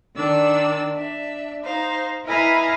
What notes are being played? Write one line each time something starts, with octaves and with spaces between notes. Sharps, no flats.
D#3 D4 D5 E6
D4 E5
D#4 C5 F5
E4 B4 D#5 F5 G#5 A#5